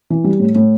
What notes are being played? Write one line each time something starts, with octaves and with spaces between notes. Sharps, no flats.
E3
G3
A2
A2